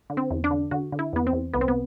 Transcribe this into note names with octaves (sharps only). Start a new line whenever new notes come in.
D3
C4
E2
D4
D3
D3 F#4
D3
E4
E2 B3
C4
E2
C2 B3
C4
B3